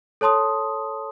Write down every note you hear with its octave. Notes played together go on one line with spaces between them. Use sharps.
A4 C#5 A5 C6 D#6